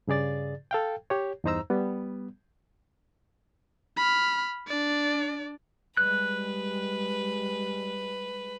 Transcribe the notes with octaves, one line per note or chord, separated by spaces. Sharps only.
G2 C#3 G#4 D5 A6
A4 F5 G5
G4 C#5
E2 G2 D#4 C5 A#5 E6
G3 B3
B5 F6
D4 D5
G3 G#3 B4 F#6